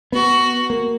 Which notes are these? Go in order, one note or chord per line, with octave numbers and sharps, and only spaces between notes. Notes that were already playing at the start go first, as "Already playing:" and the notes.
B3 F#4
A#3